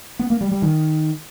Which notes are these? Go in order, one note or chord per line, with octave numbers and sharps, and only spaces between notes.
B3
A#3
G3
G3
D#3